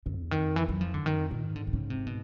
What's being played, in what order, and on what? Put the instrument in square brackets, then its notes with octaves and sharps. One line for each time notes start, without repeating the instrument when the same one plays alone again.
[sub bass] F#2 [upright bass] D3
[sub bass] F2
E2
[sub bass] F2 [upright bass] D#3
[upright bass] E3
F#3
F3
D3
[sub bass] F#2 [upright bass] D#3
[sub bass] F2
[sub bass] A#2 [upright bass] D#3
[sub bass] G#2
[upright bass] D3
D3
C#3
C3
B2